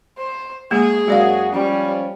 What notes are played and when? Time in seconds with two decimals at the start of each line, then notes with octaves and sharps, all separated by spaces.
0.18 C5
0.71 G#3 A#3 G#4
1.08 F#2 G#3 F#4 D5 F5
1.52 F3 G3 C#4